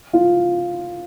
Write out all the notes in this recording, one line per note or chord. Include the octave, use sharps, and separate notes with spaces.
F4